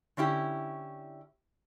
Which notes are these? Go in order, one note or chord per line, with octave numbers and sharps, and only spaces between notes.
D3 C#4 E4 G4